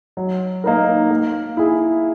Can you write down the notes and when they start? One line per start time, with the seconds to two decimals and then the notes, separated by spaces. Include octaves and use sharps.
0.17 F#3
0.64 A#3 D#4 A#4
1.11 A#3
1.57 E4 G#4